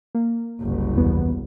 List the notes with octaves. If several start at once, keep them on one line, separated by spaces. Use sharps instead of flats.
A#3
F#1 C2
E2 B3